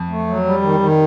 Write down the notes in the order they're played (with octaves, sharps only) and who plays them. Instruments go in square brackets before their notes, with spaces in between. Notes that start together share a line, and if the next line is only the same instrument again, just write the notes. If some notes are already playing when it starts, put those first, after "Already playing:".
Already playing: [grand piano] F2
[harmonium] A3
F#3
G3
D#3
D#3